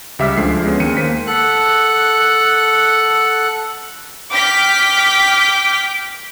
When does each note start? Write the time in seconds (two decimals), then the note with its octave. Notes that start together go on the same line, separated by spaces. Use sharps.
0.19 C#2 G3 E5 D6 F6 B6
0.37 D2 D3 F3 G#3 A3 C7
0.65 G#3 B3 C#4
0.80 D#2 D#3 C#7 D#7
0.97 A#3 C5 B6
1.27 A4 F#5 F#6
4.31 G5 D6 F6 B6